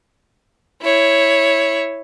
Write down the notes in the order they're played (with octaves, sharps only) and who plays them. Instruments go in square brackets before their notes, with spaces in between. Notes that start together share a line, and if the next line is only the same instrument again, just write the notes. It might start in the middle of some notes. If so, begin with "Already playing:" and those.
[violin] E4 C#5